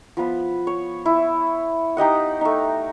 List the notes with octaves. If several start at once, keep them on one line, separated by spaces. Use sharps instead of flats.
F3 B3 F#5 B5
C#5
E4
D#4 G4 D#5 F#5
A3 D#4